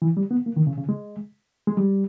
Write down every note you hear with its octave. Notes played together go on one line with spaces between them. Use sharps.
E3
G3
B3
A#3
D#3
C#3
C#3
G#3
G#3
G3